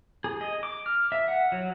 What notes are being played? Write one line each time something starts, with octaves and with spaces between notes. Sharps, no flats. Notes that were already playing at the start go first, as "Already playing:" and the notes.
G#4
D#5
D6
F6
E5
F#5
F#3